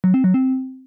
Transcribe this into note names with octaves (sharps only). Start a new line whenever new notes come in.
F#3
C4
F#3
C4